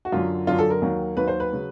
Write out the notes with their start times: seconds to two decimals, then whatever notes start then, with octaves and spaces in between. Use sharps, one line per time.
0.05 F#4
0.12 F#2 D3 F#3 F4
0.47 F#2 D3 F#3 F4
0.58 A4
0.70 A#4
0.82 D#2 D#3 F#3
1.17 D#2 D#3 F#3 B4
1.28 C5
1.40 B4
1.53 C#3 F#3